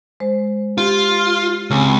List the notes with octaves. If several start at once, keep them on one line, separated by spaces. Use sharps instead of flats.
G#3 C5
F4 G4
C#2 C#3 C4 G#5